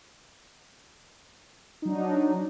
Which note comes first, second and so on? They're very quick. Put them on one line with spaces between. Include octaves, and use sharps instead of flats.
D#4 F#3 D4